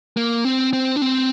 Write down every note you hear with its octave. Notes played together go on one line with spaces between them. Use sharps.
A#3
C4
C4
D4
C4